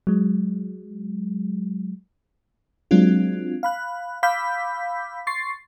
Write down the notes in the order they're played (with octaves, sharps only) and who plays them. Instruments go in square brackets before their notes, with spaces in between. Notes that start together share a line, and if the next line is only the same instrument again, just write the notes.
[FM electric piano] F#3 G#3
F#3 G#3 C4 D4 F4
F5 B5 F#6
F5 B5 D6 E6 G6 B6
C6 C#6 A6 C7